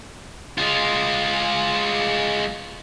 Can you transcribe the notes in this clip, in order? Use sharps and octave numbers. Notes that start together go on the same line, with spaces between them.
G#3 F4